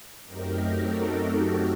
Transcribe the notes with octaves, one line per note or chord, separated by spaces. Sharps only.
F#2 F#3 A3 C4 D#4 G4 A#4
F#4 A4
G4